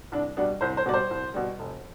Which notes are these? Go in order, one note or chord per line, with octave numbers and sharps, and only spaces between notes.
C2 D4
B2 G3 D4
C2 C5
C5
B2 G3 D5
C5
C2
B2 G3
F1